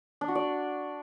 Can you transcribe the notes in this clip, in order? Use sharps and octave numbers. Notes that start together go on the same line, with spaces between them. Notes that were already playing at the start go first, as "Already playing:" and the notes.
D4
F#4
D5